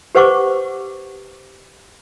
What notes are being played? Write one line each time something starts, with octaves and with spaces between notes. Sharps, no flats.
G4 B4 C5 F#5 C#6 D6